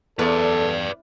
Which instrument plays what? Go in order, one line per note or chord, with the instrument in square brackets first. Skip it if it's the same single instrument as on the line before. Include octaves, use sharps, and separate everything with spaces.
[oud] E2 [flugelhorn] A4 [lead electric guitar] B4 D5